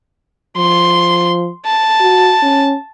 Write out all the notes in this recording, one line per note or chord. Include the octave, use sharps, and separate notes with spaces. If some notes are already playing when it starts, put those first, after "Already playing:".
F3 C6
A5
F#4
C#4